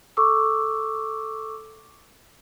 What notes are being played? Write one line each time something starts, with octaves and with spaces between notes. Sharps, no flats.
A4 C#6 D6 E6